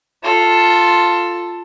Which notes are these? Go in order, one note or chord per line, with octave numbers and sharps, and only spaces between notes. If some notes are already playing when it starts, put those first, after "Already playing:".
F4 A4